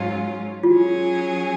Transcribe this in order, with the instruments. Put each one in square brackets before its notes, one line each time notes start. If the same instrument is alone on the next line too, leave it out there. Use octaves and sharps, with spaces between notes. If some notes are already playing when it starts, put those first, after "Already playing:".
Already playing: [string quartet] G#2 F#3 C#4 F4
[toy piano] F4
[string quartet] F#3 C#4 G#4 [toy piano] F#4